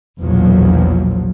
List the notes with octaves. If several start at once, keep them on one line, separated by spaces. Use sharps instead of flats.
A#1 E2 B2 F3 F#3